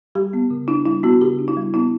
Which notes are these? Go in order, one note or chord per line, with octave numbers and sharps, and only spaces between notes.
G3 G4
B3
C#3
D4 E4
G3 E4
B3 F#4
C#3 G4
D4
E4
G3
B3 E4